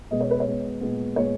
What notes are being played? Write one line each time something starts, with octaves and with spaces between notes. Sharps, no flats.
B2 G#3 B3 D#5
C#5
B4
C#5
B2 G#3 B3
A#2 G#3 B3
A#2 G#3 B3 C#5